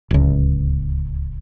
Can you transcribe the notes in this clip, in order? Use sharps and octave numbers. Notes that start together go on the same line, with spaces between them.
D1 C#2